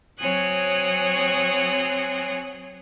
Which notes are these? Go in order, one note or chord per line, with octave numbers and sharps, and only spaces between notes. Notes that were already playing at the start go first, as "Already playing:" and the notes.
F#3 C4 C#5 G#5 D#6 F#6